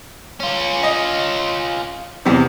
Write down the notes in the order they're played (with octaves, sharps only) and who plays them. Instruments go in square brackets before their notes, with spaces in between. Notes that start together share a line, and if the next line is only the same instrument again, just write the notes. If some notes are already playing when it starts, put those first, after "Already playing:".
[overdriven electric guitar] C#4 F4
[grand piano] D#5
E2 C3